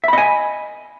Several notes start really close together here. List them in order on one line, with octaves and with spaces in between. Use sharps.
E5 B5 D#5 G#5